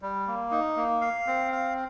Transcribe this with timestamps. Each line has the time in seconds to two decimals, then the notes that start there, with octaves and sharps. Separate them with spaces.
0.02 G3
0.27 A#3
0.51 D#4
0.76 A#3
1.01 F5
1.27 C4
1.52 F5